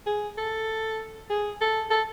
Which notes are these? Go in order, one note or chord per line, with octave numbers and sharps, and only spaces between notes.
G#4
A4
G#4
A4
A4